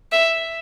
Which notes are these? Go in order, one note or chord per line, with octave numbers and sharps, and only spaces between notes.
E5